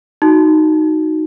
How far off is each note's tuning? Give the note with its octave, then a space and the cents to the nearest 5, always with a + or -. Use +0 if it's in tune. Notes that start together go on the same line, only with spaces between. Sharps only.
D#4 +0 F#4 +0